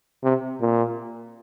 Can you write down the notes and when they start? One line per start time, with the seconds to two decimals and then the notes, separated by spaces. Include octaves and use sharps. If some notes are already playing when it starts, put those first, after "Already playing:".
0.24 C3
0.61 A#2